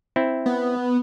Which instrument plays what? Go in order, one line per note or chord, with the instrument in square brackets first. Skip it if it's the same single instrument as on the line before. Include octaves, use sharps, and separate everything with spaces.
[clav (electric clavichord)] C4 E4
[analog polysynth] B3